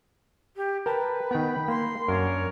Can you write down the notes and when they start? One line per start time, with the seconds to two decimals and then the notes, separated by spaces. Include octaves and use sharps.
0.56 G4
0.86 A#4 B4 G5 A5
1.31 D#3 B3 G5 B5
1.68 A#3 C6
2.08 F#2 D4 A#4 C#5